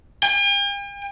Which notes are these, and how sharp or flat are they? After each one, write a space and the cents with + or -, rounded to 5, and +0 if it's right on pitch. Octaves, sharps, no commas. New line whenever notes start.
G5 +45